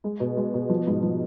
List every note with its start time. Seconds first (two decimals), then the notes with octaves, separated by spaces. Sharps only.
0.04 G#3
0.20 B2
0.37 G#3
0.54 B2
0.70 F3
0.87 G#2
1.02 F3